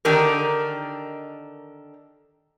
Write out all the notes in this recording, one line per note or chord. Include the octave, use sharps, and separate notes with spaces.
D3 D#3 D4 D#4 G4 A#4